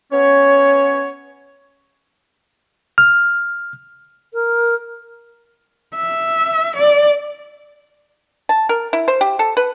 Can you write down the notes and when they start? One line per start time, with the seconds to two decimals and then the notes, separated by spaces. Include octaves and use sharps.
0.12 B3 C#4 C#5
2.98 F6
4.33 A#4
5.95 E5
6.76 D5
8.49 A5
8.69 A#4
8.93 E4
9.08 C5
9.21 G4
9.39 A4
9.57 B4